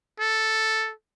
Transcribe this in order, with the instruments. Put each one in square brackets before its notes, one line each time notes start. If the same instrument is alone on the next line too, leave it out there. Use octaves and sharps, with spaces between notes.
[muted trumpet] A4